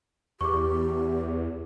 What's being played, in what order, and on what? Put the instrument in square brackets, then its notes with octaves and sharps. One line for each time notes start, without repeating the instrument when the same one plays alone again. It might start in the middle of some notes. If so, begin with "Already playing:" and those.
[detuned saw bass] E2 [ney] G4 [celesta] C#6 D6